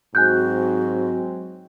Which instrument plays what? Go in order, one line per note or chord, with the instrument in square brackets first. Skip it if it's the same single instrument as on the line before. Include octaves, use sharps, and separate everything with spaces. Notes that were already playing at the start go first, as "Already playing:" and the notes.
[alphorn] G#2 [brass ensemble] F#3 G#3 C4 [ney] F#4 [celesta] G#5 F#6 G6